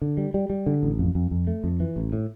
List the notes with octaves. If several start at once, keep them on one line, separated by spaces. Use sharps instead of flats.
D3
G3
G3
G3
D3
A1
F2
F2
F2
A3
F2
E3
A1
A2